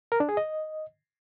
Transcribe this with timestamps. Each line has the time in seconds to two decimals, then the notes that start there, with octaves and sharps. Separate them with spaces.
0.12 A#4
0.20 D4
0.29 G#4
0.37 D#5